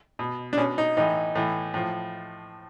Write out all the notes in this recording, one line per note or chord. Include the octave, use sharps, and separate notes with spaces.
B2
D4
B2 C#4
D#4
A2 E3 D#4
A2 E3
A2 F3